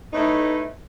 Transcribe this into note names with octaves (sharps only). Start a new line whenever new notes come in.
A2 A3 B3 D#4